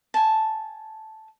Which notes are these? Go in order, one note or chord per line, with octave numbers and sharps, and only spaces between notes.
G#5 A5